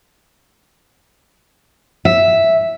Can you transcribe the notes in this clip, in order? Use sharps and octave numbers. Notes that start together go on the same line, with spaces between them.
E5